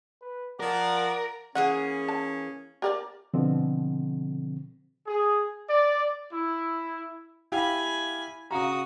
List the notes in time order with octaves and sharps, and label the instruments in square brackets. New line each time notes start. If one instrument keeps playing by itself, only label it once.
[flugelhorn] B4
[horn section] F3 D5 [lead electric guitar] A#4 [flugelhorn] F#5
[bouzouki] E3 A#3 G#4 [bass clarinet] C#4 [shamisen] F#5
[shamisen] A5
G4 A#4 D5
[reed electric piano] B2 D3 F3 C4
[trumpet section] G#4
D5
E4
[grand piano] E4 G4 F5 [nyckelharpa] G#5 B5
[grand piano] C#3 F5 A#5 [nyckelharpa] F#4 D#6